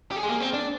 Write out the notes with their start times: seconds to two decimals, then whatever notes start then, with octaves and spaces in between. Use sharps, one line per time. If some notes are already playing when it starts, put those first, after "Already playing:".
0.12 G4
0.16 G#4
0.23 G#3
0.29 A#3
0.40 C4
0.53 D4